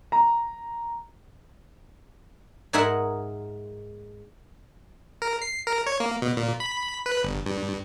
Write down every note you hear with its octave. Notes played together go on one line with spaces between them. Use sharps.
A#5
G#2 G#4 A#4 D#5 E5 F#5
A#4
C7
A#4
C#5
A#3
B2
A#2
B5
B4
G1
G2